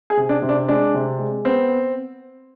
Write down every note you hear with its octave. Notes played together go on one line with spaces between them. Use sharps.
G#4
C3
D4
C3
D4
G#3 D4
C3
G#3
B3 C4